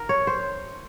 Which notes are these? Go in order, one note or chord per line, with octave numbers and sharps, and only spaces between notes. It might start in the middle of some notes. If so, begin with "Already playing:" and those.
Already playing: A#4
C#5
C5